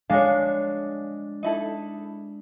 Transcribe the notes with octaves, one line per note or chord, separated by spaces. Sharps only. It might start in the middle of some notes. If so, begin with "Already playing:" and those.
G#3 D4 C#5 F5
D#4 E4 A4